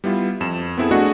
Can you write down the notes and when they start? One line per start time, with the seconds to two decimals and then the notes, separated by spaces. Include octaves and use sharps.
0.04 G3 B3 E4 F4
0.41 F2 E7
0.78 B3 C4 E4 G#4 A4
0.91 A3 D4 F#4 G#4 D#5 F#5